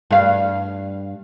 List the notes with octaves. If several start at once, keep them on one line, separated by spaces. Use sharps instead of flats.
G2 F5